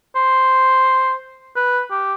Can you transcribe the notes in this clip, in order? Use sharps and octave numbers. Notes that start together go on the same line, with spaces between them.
C5
B4
G4